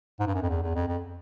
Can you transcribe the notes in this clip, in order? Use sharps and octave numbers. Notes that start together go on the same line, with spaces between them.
G#2
G2
F#2
F2
E2
E2
F2
F2